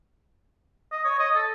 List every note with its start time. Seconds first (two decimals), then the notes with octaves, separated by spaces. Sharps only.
0.92 D#5
1.05 C#5
1.19 D#5
1.35 A4